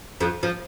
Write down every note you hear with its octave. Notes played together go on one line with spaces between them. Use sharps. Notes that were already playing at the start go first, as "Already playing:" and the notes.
F2 F3
F3